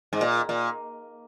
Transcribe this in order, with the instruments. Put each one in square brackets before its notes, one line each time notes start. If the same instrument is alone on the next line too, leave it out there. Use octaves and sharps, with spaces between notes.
[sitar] G#2
A#2
A#2